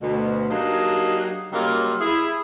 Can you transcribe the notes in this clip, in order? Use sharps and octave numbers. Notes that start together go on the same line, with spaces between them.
D2 B2
F#3 A#3 D4 D#4 G4 G#4
C#3 F#3 G3 A#3 D#4 F4
E4 G#4